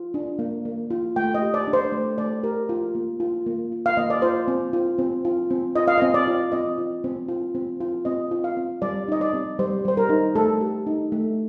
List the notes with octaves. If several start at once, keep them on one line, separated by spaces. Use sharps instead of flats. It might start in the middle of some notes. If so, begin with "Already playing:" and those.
Already playing: F4
D4
A#3
A#3
F4
A3 G5
D#5
G4
D5
D4
C5
A3
A3 D5
G4 A#4
F4
A#3
F4
A#3
F4
F5
A#3 D#5
D5
F4 C5
C4
F4
C4
F4
C4
F4 D#5
F5
C4 D#5
D5
F4
C4 D#5
F4
C4
F4
C4
F4
C4 D#5
F4
F5
C4
G3 D5
D#4 D#5
D5
C4
G3 C5
G3 C5
A#4
D#4
A3 A4
G4
D#4
A3